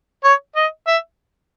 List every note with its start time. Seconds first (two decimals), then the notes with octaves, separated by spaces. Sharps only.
0.24 C#5
0.56 D#5
0.87 E5